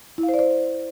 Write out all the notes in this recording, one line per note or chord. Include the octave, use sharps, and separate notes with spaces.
E4
F5
C5
D5
C5